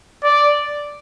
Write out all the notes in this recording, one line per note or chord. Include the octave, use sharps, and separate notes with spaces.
D5